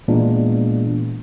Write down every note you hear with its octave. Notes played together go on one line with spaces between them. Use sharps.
A#2 E3 G#3 B3 D4